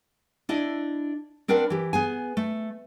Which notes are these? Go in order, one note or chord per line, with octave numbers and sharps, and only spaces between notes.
D4 E4 D#5
C4 D4 A#4 B4 F#5
E3 G4
B3 G#4 G#5
A3